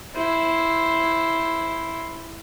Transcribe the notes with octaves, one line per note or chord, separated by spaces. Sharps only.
E4 C5